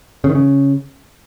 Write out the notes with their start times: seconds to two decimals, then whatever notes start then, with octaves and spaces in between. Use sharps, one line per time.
0.24 C#3
0.30 D#3
0.35 C#3